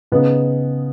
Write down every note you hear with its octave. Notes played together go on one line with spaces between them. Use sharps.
C#3 B3 D#4